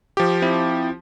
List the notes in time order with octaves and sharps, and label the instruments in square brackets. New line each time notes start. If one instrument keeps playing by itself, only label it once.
[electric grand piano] F3 G4
[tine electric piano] C4 E4